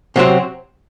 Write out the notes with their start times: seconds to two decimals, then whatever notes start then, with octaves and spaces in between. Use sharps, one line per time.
0.16 C3 F#3 C4 F#4